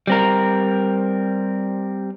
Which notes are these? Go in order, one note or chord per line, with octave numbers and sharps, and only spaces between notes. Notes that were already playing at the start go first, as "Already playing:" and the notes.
G3 C4 A#4